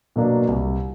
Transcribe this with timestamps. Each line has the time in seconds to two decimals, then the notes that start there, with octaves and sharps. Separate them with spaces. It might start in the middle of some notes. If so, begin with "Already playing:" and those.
0.16 B2 F#3 A#3 D4
0.48 C2